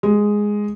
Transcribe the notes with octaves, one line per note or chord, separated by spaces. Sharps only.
G#3